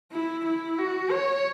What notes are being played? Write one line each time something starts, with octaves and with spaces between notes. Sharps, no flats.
E4
E4
F#4
C#5